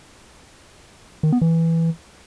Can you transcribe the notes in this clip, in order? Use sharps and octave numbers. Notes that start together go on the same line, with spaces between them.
D#3
B3
E3